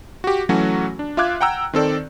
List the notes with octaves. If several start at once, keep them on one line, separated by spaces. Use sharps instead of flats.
F#4 G4
E3 F#3 A3 C#4 F#4
D4
F4 E5 F5 D6 F#6 G#6
F#5 G5 A#5 E6
D#3 C4 A4 D5